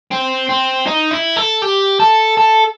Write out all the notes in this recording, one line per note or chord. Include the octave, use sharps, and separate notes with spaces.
C4
C4
D#4
E4
A4
G4
A4
A4